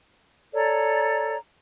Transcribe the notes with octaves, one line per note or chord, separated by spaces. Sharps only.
A4 C#5 D5 A#5